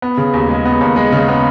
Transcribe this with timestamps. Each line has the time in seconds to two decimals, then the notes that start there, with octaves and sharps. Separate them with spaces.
0.02 B3
0.17 C#3
0.34 D#2
0.49 G#3
0.65 B3
0.81 D#2
0.96 G#3
1.12 C#3
1.28 B3